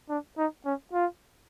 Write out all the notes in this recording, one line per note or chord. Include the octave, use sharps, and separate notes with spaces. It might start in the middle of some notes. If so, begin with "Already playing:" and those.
D4
D#4
C#4
F4